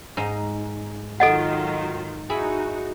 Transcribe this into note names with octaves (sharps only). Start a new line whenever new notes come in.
G#2 D#4
D#3 F#3 F4 A4 D#5 F#5
D#4 E4 F#4 G#4 B5